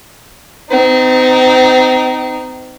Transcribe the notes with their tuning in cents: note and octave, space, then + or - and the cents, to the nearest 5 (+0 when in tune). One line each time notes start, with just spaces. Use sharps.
C4 -35 D#4 +0